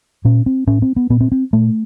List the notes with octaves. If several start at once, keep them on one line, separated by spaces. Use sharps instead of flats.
A#2 C#4
C4
A2 C#4
C4
B3
A#2 B3
C4
C4
A#2 A3